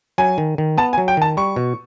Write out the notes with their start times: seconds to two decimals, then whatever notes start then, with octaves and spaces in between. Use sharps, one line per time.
0.18 F#3 G#5
0.38 D#3
0.58 D#3
0.78 B3 A5
0.93 G#5
0.98 F#3
1.08 G5
1.17 D#3 A5
1.37 G3 C#6
1.56 B2